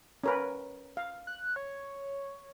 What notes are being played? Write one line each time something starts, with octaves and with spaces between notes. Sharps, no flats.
C#4 A#4 B4
F5
F#6
C#5